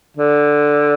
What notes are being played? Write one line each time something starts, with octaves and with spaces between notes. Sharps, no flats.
D3